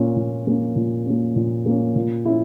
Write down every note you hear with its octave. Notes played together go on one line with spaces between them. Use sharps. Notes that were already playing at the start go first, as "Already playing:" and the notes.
Already playing: A#2 A#3 C#4
A#2
A#3 C#4
A#2
A#3 C#4
A#2
A#3 C#4
A#2
C#4 E4